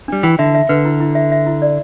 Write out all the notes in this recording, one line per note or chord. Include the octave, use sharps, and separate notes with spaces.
G3 D4
E3 G5
D3 E5
E5
D3 B4
E4
E4
E5
E5
E4
D5